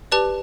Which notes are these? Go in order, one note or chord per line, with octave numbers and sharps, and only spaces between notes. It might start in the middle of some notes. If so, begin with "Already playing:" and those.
G4 B4 D5 A5